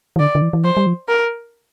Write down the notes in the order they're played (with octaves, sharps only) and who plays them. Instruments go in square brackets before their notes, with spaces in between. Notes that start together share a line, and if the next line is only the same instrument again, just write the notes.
[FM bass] E3
[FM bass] D3 [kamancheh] D5
[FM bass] D3
E3
E3
[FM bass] F3 [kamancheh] C5
[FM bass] G3
F3
[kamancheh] A#4